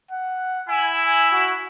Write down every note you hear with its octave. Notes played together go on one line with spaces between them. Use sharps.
F#5
E4 G#5
G#5
F#4